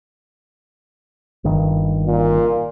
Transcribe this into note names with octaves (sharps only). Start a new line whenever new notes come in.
G1 G2 D#3
A#2